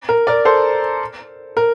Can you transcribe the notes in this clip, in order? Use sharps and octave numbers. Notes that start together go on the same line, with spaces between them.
A#4
A#4 D5
A4 C5
A#4